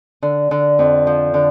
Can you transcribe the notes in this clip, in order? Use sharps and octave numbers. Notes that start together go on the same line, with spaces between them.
D3
D3
F2
F3
D3